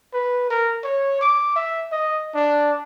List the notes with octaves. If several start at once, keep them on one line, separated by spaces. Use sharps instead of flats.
B4
A#4
C#5
D6
E5
D#5
D4